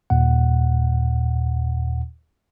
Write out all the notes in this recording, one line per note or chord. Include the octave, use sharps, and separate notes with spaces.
D#2 A#2 F#5